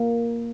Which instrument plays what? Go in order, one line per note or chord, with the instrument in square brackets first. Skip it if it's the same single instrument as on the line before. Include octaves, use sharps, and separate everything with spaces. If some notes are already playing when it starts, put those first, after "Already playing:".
Already playing: [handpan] A#3